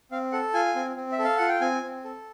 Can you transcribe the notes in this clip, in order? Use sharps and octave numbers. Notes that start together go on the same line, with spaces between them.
C4 F5
A4 F#5
F4 G#5
C4
C4
E5
A4
F5
F4 F#5
G5
C4 G#5
C4
A4